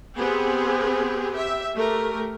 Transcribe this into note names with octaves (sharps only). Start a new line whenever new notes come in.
B3 C4 G4 G#4
G4 E5
A3 G4 A#4